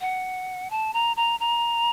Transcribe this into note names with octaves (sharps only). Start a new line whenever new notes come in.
F#5
A5
A#5
A#5
A#5